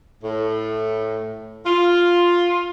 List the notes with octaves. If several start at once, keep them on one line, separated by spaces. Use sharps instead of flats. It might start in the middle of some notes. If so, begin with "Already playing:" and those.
A2
F4